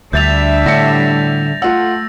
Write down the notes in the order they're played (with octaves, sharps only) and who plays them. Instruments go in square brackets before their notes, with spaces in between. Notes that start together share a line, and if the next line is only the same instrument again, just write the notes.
[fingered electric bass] D2 [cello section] G3 D4 E5 [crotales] G6 A6 F7
[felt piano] A2 E6 C#7 [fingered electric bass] D3 [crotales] A#6
[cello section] A3 [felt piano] F4 F#5 [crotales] E6